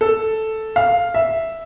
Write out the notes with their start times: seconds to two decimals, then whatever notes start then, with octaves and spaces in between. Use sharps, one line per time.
0.01 A4
0.76 F5
1.14 E5